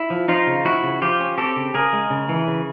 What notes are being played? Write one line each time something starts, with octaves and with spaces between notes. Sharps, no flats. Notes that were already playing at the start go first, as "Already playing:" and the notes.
Already playing: E4
F3
F3 D#4 F4
C#3
F3 E4 F#4
C#3
F3 F4 G4
C#4
C4 G4 A4
C#3
C#3 G#4 A#4
G#3
C#3
E3
C#3